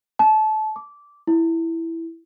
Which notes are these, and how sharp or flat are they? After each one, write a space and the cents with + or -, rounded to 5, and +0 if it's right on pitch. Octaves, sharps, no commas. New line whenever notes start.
A5 -25
D6 -15
E4 +0